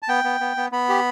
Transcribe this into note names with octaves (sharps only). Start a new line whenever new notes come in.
A5
B3 G5
B3
B3
B3
B3 B5
G4